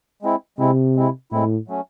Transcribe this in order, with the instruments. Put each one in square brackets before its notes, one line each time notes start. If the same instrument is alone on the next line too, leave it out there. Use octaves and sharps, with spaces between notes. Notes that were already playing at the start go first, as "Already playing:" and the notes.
[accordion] G#3 C4 E4
[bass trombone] C3 [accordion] G#3 C4 E4
[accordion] G#3 C4 E4
[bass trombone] A2 [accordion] G#3 C4 E4
[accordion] F#3 A3 C#4